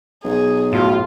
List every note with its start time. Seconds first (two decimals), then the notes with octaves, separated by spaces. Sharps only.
0.24 B1 G#4
0.73 A2 F4 F#4